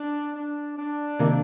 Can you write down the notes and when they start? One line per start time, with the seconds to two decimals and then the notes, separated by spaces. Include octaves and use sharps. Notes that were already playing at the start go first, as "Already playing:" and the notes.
Already playing: D4
0.35 D4
0.77 D4
1.19 C3 D#3 A#3